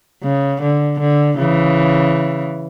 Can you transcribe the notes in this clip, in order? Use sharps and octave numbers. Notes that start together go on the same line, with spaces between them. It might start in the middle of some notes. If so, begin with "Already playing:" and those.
C#3
D3
D3
C#3 E3